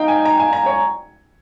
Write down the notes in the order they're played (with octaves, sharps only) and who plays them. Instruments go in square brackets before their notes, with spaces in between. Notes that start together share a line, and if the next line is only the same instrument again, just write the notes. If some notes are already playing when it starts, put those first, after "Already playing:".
Already playing: [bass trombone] D#4 [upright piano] F5 G5
[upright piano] G#5
A#5
G#5
A#5
C#5